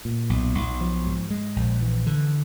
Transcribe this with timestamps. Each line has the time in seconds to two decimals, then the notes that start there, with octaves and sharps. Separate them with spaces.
0.05 A#2
0.30 B1
0.55 B1
0.81 F3
1.06 G#2
1.30 G#3
1.56 A#1
1.81 E3
2.07 D3